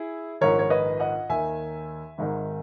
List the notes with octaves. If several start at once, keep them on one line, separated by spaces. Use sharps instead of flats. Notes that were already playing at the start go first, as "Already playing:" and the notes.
Already playing: E4 G#4
A#1 G#2 D#3 A#4 C#5
C#5
B4 D#5
D#5 F#5
D#2 D#3 E5 G#5
G#1 G#2 D#3